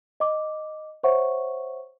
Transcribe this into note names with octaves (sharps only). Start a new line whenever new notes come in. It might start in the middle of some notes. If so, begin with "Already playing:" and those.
D#5 D6
C5 C#5 E5 F#5 C#6